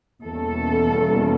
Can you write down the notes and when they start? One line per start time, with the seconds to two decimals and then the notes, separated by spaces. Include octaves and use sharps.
0.25 E2 B2 G3 A#3 C#4 A4